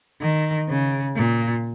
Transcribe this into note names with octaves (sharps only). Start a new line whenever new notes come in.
D#3
C#3
A#2